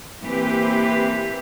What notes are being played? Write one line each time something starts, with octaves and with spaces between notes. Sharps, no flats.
E3 A#3 C4 G4 B4